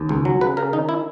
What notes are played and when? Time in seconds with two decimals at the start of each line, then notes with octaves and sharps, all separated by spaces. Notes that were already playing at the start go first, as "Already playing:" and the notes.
Already playing: D#2
0.09 C#2
0.25 F#3
0.41 C#3 B4
0.57 C#3 A#4
0.73 D#3 D#4
0.89 E4